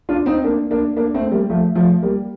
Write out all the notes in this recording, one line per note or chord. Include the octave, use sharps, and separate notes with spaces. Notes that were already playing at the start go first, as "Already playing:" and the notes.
D4 F4
C4 D#4
A#3 D4
A#3 D4
A#3 D4
A3 C4
G3 A#3
F3 A3
F3 A3
G3 A#3